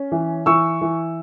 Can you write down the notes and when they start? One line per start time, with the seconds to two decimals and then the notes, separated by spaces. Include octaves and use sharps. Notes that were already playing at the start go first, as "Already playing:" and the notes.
Already playing: C#4
0.12 E3
0.46 E3 C#6 E6
0.81 E3